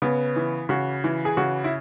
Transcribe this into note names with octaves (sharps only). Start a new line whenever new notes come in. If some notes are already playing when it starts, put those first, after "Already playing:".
C#3 B3
E3
C#3 F#4
E3
G#4
C#3 F#4
E4